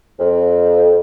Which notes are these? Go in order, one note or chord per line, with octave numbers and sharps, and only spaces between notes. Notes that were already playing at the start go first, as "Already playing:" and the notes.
F2